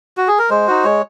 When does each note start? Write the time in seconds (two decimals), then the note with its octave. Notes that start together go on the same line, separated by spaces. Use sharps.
0.17 F#4
0.28 G#4
0.39 A#4
0.50 G#3 C5
0.67 D#4 F#4
0.84 G#3 C#5